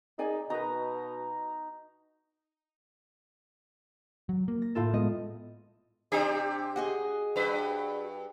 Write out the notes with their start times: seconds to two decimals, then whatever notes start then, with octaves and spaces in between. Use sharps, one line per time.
0.19 D#4 G#4 D5 G#5
0.50 B2 D#4 F#4 B4 A#5
4.29 F#3
4.48 A#3
4.62 A#6
4.75 A2 F4 A4
4.94 G#3 B3 D#5
6.12 C3 D4 G4 G#5
6.76 F#4 G#4 D#5
7.36 G2 B4